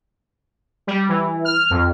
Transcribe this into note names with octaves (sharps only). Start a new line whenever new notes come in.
G3
E3
F6
F2